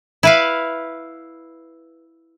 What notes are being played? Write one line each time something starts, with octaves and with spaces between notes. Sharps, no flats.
E4 B4 F5